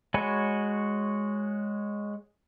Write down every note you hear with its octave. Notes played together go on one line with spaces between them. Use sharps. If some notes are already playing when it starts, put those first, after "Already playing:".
G#3 F#4 C#5 G#5 B5